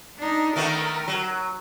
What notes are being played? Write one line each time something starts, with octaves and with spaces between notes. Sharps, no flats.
D4 D#4
D#3 A3 B3 A#4
F#3